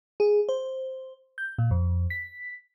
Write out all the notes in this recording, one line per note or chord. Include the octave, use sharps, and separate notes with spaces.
G#4
C5
G6
A#2
F2
B6